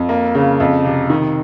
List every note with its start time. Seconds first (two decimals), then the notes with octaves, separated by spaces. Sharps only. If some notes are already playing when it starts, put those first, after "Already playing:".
Already playing: F2
0.09 A#3
0.35 C#3
0.60 F2
0.85 C3
1.10 D#3